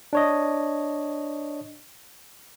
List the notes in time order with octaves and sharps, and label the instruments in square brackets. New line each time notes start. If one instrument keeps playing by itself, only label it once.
[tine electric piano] D4 C#5 D#5